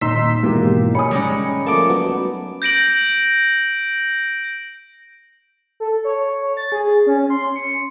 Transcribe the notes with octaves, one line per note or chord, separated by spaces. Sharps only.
D#1 D#4 C6 E6 B6
G#2 B2 E3 A#3 G4
C#5 G#5 B5 D#6 C#7
G3 G#3 C#4
F3 A3 A#3 A5 D6
F#3 B3
G6 A#6 D7 F#7
A4
C#5
A6
G#4
C#4
C6
C#7